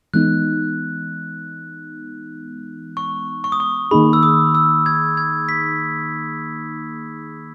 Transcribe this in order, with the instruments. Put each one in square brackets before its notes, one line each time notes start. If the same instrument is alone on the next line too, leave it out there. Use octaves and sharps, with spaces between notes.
[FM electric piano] E3 G#3 B3 D#4 [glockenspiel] F#6
[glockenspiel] C#6
C#6
D#6
C#6
[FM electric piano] D#3 A#3 D#4 G#4 [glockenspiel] B5
[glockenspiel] E6
D#6
E6
G#6
G#6
B6